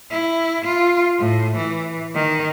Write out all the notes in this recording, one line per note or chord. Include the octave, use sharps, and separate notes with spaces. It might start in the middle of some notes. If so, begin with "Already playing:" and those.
E4
F4
A2
E3
D#3